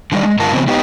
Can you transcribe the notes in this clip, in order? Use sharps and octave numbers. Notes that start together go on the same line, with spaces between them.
D3 D#3 G3 D5
G#3
G2 D3 F4 A#4 A5
C#3 F3 B3 C4
B3 D#4 G4